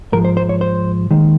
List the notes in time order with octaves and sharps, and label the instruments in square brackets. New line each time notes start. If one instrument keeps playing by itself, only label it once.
[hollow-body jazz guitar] G#2 F3 G#3 A#4
C5
C5
C#5
C5
D#2 D#3 G#3